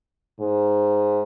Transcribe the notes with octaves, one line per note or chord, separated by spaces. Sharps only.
G#2